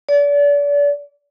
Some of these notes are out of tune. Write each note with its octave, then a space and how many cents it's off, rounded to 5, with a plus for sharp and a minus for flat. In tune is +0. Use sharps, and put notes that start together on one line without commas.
D5 -35